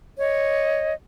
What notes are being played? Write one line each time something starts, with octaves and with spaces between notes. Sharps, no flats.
C#5 D#5